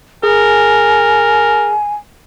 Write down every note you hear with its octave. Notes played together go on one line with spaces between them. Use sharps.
G#4 A#4 G#5